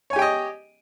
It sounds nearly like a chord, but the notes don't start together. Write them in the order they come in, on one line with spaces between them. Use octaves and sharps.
C#5 G#5 G4 G5 D#5